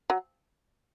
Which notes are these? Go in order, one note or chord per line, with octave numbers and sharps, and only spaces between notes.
F#3